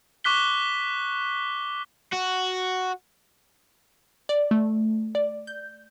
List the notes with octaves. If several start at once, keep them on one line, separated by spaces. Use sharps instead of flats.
C#6 D6 F#6 B6 G7
F#4
D5
A3
D5
G6